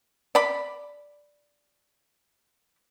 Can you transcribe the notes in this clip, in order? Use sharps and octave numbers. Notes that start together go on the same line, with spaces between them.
D5 B5